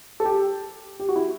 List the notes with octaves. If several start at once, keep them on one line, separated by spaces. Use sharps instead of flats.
A4
G4
G4
F#4
E4